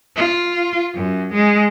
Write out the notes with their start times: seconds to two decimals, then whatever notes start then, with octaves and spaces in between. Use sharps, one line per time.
0.16 F4
0.95 F#2
1.33 G#3